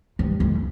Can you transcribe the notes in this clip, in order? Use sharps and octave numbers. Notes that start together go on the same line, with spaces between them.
G2
F2